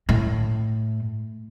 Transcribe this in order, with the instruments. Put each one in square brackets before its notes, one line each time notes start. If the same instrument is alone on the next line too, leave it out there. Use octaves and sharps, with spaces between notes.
[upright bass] A2